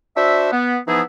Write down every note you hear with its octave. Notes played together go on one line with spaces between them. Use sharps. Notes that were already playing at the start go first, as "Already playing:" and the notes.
D4 F#4 C5 E5
B3
E3 F3 B3 D#4 E4 G#4